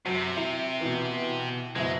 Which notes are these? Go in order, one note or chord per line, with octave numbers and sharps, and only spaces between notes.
F#2 C3 F#3
E4 F7
B2 E3
F#1 B2 G#3 E4